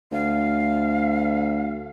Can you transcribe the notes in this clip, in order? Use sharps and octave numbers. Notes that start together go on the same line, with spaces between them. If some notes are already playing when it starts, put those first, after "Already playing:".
D2 F5